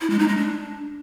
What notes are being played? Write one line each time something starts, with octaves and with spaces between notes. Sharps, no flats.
E4
G#3
D#4
G#3
D4